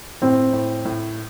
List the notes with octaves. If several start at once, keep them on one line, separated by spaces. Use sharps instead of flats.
A2 C4
A2
A2